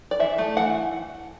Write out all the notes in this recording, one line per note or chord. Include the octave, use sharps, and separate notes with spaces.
D5
E3 E5
A3
E3 F#5